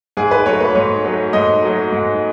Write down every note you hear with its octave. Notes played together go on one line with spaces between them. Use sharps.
G#2 G#4
B4
F#3 A3 C#5
B4
G#2 C#5
F#3 A3
G#2 D#5
F#3 A3
G#2